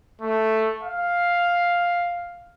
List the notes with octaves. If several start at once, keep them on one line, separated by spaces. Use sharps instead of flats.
A3
F5